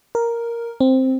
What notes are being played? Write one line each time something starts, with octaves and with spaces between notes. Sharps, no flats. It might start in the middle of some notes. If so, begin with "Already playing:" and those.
A#4
C4